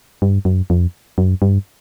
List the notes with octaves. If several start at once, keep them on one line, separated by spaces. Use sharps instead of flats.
G2
F#2
F2
F#2
G2